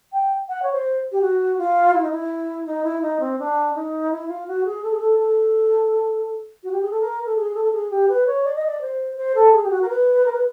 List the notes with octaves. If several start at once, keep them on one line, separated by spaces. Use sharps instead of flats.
G5
F#5
C#5
C5
G4
F#4
F4
E4
D#4
E4
D#4
E4
D#4
C4
D4
D#4
E4
F4
F#4
G#4
A4
G#4
A4
A4
F#4
G4
G#4
A4
A#4
A4
G#4
A4
A4
G#4
G4
B4
C#5
D5
D#5
D5
C5
C5
A4
G#4
G4
F#4
A#4
B4
A#4
B4